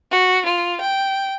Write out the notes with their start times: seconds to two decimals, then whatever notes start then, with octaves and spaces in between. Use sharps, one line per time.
0.12 F#4
0.46 F4
0.80 G5